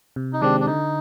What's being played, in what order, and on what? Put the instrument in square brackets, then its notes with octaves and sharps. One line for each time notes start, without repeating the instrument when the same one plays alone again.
[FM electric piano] C3
[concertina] D#4
[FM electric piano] D#3 G#3 C4 G4 [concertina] D4
[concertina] D4
[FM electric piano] D3 [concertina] D#4